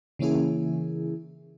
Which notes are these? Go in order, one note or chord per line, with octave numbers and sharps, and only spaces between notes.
C#3 E3 A#3 C#4 E4 G#4